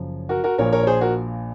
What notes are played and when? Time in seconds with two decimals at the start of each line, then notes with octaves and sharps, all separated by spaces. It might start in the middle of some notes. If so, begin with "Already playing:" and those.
Already playing: F#1 F#2 F3
0.29 F#4 A#4
0.44 F#4 A#4
0.58 A#1 A#2 F3 A#4 C#5
0.72 A#4 C#5
0.83 C#5
0.87 G#4 C5
1.01 F#4 A#4